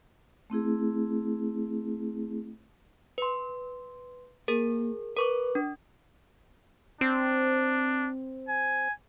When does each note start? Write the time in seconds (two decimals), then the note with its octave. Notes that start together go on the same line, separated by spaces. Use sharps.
0.50 A3 C4 E4 G#4
3.18 B4 C6
4.48 A#3 G#4 A#4
5.16 A#4 B4 C#6 D6
5.55 D4
7.01 C4 D4
8.49 G#5